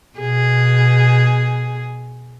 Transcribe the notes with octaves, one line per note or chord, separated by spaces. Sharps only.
B2 G#4